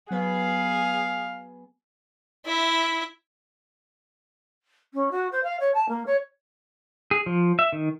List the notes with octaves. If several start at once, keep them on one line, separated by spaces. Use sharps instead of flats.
F#3 B3 G#4 B4 F5
E4 E5
C#4
F#4
C5
F5
C#5
A5
A#3
C#5
G#4
F3
E5
D#3